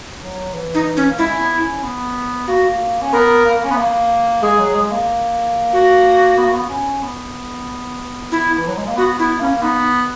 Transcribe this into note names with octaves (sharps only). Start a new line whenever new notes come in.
F#3
E3
D#4
C#4
A#3
G#3 E4
C#4
B3
C#4
B3
A#3 F#4
C#4
B3 A#4
A#3
C#4
B3
A#3
G#3 G#4
F#3
G#3
A#3
F#4
B3
A#3
B3
C#4
B3
E4
E3
F#3
G#3
A#3
B3 F#4
B3 E4
A#3 C#4
B3 D#4